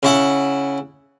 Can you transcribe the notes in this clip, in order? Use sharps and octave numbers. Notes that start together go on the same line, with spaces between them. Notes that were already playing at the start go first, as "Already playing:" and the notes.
C#3 E4 F#5